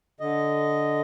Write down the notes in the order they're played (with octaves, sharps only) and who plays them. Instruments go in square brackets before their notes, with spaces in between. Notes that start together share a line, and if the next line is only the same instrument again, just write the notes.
[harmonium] D3 D#5